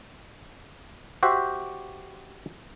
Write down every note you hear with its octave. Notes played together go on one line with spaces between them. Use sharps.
F#4 G4 C5 E5